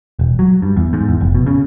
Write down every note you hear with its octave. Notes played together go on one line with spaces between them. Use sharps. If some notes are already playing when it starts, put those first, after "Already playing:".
E1
F#3
G2
E2
G#2
E2
F1
B2
C#3